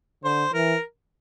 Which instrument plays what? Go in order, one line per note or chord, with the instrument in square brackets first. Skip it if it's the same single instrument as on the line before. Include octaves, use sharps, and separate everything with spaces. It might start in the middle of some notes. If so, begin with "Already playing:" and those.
[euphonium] D3 [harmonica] C5
[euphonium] E3 [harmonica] A#4